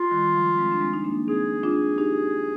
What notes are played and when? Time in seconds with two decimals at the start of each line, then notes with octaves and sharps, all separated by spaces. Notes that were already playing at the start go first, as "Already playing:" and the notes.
Already playing: F4
0.11 D#3 G3
0.34 F3 G#3
0.58 G#3 C4
0.72 D4
0.81 G#3 C4
0.93 D#4
1.04 A#3 D4
1.28 C4 D#4 G#4
1.63 D4 F4
1.98 D#4 G4